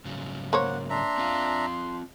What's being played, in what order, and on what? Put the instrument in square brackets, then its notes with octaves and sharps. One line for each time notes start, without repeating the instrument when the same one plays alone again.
[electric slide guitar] G#2 C#3 F#3
[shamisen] A#3 C5 C#5 [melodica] F#5
[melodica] D4 E5 A#5 [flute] C6
[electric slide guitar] C4 F4 F5